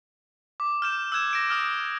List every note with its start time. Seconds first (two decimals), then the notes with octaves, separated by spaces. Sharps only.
0.60 D6
0.82 F6 G6 E7
1.12 E6 F#6 G#6 E7
1.31 A#6 D7 E7
1.49 D#6 F6 D7